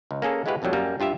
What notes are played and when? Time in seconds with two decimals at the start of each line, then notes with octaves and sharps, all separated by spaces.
0.11 C#2
0.22 A#3 C#4 G#4 A4
0.46 G#3 E4 F#4 G4 B4 F5
0.62 A#1 F2 A2 F#3 G3
0.73 F#2 G3 A#3
1.00 G2 F4 G4 E5